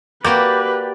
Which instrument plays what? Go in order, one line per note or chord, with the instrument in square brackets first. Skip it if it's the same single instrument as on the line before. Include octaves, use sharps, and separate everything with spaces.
[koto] A#3 F#4 G4 [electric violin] B4 [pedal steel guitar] D5 G5